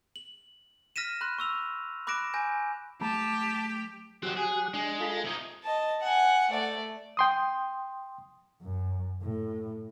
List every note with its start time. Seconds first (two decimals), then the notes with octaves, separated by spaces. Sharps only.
0.16 F#7
0.96 F6 A#6 B6 D#7 E7
1.21 B5 C6 F#6
1.39 C#6 E6 F7
2.07 B5 D6 F#6 A#6 D7 E7
2.34 G#5 G6 A#6
3.01 F#3 A3 G4 A5 A#5
4.23 D#3 F#3 C4 G4 F#5
4.37 G#4
4.74 G#3 D4
5.00 F4 A4 B5
5.24 C3 D#4 G#5
5.64 D#5 A5
6.01 F#5 G#5
6.50 A3 D5
7.17 G5 C6 D#6
8.62 F#2
9.22 A2